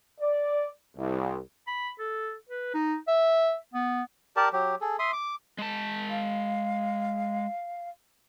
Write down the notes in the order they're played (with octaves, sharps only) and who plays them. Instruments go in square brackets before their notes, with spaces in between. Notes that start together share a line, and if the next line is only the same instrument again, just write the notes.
[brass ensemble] D5
C2
[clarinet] B5
A4
B4
D#4
E5
B3
[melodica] G4 A#4 D5 A5
F#3 G4
G#4 A4
E5 C6 D#6
D6
[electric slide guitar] G#3 A5
[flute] F5